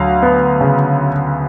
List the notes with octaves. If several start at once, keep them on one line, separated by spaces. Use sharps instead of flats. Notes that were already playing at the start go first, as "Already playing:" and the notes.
Already playing: D2 F#3 F5
B3
C#3